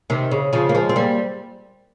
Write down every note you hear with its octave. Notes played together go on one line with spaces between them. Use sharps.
C3 D#3
C#3
C#3 F3
A#3
F3 G#3
C4
G3 A#3